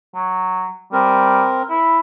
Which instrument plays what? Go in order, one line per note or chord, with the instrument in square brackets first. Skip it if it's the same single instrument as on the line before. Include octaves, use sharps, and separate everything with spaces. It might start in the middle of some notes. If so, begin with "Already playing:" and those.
[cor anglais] F#3
[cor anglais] G3 [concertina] C4 A#4
[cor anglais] E4